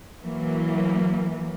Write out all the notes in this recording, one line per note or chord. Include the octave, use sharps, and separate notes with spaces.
E3 F#3 A#3